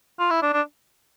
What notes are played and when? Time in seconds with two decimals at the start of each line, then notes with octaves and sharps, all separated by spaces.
0.19 F4
0.30 E4
0.42 D4
0.53 D4